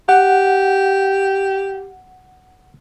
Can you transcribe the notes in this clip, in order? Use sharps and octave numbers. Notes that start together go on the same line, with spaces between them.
G4 F#5